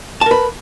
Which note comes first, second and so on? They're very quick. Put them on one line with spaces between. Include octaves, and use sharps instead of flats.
A5 A#4 B4